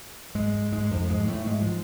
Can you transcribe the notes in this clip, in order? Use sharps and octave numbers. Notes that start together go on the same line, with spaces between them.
G#2 G#3
G#2 G#3
F2 F3
G#2 G#3
A2 A3
G#2 G#3
F3